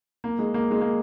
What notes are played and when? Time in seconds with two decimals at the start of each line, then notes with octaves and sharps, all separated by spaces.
0.24 A#3
0.39 G#3
0.54 A#3
0.71 G#3
0.81 A#3